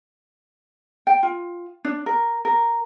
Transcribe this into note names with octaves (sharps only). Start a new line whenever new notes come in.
G5
F4
D4
A#4
A#4